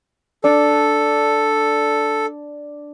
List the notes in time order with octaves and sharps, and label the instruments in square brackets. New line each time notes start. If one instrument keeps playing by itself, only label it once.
[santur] D4 [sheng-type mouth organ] A4